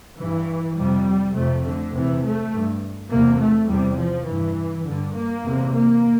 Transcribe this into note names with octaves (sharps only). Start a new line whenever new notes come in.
G2 E3
F2 C3 G3
F2 C3 A3
D3
E2 C3 E3
A3
G2
C3 A#3
E2
A3
E2 C3 G3
F3
G2 E3
G2 D3
A#3
E2 C3
A#3